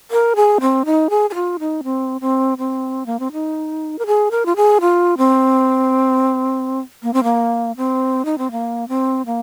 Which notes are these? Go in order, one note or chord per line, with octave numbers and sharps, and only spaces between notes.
A#4
G#4
C4
D#4
G#4
G#4
F4
D#4
C4
C4
C4
A#3
C4
D#4
A#4
G#4
A#4
F4
G#4
F4
C4
A#3
C4
A#3
C4
D#4
C4
A#3
C4
A#3